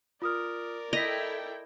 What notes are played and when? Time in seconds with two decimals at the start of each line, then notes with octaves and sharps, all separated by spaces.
0.22 F4 A#4 D5 D#6 F6
0.93 E4 A4 D#5 G5 B6 F7